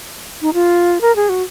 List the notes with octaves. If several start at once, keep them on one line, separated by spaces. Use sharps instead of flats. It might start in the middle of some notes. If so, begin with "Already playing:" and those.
D#4
F4
A#4
G#4
F#4